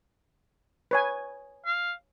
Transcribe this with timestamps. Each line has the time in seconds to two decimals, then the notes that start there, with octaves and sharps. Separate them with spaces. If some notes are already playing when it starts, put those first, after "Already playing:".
0.91 B4 C#5 G#5
1.66 F5